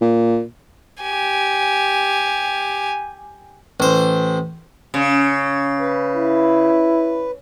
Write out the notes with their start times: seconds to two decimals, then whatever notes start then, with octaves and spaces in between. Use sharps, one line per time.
0.01 A#2
1.02 G4 G#5
3.80 A1 C5
4.94 C#3
5.80 B4
6.16 E4